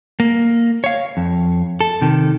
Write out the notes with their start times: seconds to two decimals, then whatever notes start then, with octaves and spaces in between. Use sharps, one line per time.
0.20 A#3
0.84 C#5 F5
1.17 F2
1.81 A4
2.01 C3 D#3